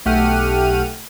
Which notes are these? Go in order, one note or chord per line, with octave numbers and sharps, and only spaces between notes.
B1 A3 G4 F#5 F6 D#7